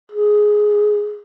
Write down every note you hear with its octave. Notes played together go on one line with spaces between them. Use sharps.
G#4